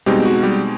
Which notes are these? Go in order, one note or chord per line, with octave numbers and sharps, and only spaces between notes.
B2 G3 G#3 C4 D#4 G4
F#4
G3 G4